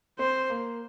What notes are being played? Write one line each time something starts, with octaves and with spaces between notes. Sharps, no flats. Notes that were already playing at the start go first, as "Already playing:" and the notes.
C4 C5
A#3